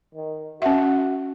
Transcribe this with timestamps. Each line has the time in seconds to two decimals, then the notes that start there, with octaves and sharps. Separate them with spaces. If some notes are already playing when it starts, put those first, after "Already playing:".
0.14 D#3
0.62 C#4 F#4 E5